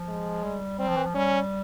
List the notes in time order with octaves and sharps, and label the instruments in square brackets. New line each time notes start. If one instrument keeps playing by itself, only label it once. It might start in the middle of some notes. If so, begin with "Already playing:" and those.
Already playing: [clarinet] F3
[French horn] G#3
[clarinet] G3
[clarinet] G3 [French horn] C4
[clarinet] F3
E3
F3
[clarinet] G3 [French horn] C#4